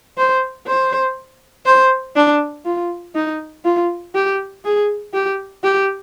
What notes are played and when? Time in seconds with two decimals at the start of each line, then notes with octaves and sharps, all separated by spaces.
0.18 C5
0.67 C5
1.66 C5
2.16 D4
2.65 F4
3.15 D#4
3.65 F4
4.15 G4
4.64 G#4
5.14 G4
5.64 G4